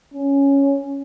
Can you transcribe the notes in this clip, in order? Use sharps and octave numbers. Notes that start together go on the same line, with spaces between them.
C#4